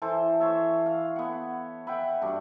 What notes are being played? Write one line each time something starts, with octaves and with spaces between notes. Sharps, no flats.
E3 A4 C5
C5 C#5 E5
F5
B3 F#5
B4 E5 F#5 G5
G2 D4 F#4